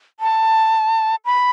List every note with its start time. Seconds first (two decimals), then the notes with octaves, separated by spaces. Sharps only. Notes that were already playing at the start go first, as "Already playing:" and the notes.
0.20 A5
1.25 B5